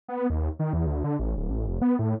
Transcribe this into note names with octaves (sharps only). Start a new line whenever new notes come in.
B3
D#2
D#3
E2
D2
D3
A1
D1
A1
F1
B3
A2